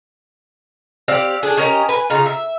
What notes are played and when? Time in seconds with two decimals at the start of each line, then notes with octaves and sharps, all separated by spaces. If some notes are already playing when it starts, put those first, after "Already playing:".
1.08 C4 G4 D5 F5
1.43 D4 G#4
1.57 C#4 G4 A#4 D#5
1.89 B4 G#5
2.10 C#3 D#4 F4
2.26 E5